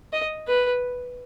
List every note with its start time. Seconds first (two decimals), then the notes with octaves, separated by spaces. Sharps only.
0.13 D#5
0.48 B4